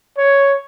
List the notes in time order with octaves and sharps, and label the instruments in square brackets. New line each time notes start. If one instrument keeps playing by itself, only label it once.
[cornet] C#5